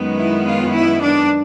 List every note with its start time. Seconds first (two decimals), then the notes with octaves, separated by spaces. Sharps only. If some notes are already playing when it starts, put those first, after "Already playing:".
Already playing: F#2 D#3 G#3 B3
0.17 E4
0.46 F4
0.73 E4
1.02 D4